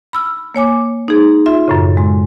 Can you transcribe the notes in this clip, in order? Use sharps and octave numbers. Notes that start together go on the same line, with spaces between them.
B5 E6 F6
A#3 C#5 G#5 D6
D#4 G#4
F4 E5 C6
F#2 A2 C#3
G#3 C6